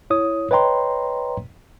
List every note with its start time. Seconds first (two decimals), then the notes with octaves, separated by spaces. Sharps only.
0.10 E4 C#5 D#6
0.51 B4 C#5 D#5 G5 A#5 C6